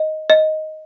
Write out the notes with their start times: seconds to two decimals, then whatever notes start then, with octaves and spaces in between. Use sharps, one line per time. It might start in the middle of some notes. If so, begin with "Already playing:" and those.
Already playing: D#5
0.30 D#5